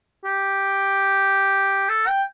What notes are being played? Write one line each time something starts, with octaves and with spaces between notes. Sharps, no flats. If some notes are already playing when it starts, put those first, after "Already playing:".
G4
A4
G5